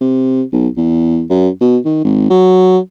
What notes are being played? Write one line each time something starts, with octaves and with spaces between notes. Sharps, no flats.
C3
B1
E2
F#2
B2
D#3
G#1
F#3